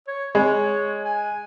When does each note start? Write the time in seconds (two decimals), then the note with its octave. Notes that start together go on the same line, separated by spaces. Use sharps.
0.08 C#5
0.35 G#3 C#5
1.04 G#5